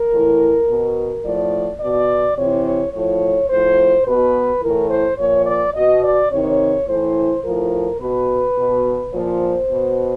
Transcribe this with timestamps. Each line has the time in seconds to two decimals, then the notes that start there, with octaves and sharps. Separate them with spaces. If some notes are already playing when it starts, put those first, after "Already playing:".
Already playing: A#4
0.12 A2 E3
0.68 B2
1.25 A2 F3 D5
1.81 B2 D5
2.37 C3 E3 C#5
2.66 C#5
2.93 A2 F3 C#5
3.49 A2 F3 C5
4.06 B2 B4
4.62 A2 E3 A#4
4.90 C5
5.18 A#2 F3 C#5
5.46 D5
5.74 B2 D#5
6.03 D5
6.31 C3 D#3 C#5
6.87 A2 E3 C5
7.43 A2 F3 A#4
7.99 B2 B4
8.57 B2
9.13 A#2 F3 C5
9.69 B2